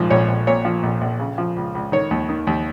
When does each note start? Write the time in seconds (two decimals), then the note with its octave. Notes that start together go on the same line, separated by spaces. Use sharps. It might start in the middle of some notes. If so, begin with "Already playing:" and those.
Already playing: A#1 G#2 F3
0.10 A#1 C#5
0.28 A#1
0.47 A#2 C#5
0.65 F3
0.83 A#1
1.01 A#1
1.19 C#3
1.38 F3
1.57 C#2
1.75 C#2
1.92 D#3 C#5
2.11 D#2
2.29 D#3
2.47 D#2